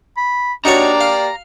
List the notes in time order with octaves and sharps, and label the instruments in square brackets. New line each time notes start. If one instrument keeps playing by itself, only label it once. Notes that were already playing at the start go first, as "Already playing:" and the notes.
[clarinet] B5
[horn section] A#3 G4 D5 [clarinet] D4 [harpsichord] D#4 F#4 C#5 [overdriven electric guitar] A#5
[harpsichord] F5